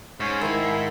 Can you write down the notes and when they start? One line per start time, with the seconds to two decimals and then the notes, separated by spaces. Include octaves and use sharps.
0.20 G#2 C#4
0.41 D#3 E4 G#5